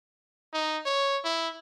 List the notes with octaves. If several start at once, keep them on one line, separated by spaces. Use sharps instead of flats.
D#4
C#5
E4